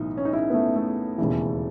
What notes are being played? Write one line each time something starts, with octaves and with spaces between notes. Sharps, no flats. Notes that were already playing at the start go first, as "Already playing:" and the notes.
Already playing: B1 A2 E3 D#4
C#4
D#4
C#4 E4
B3
A3
A3
E1 D#2 C#3 E3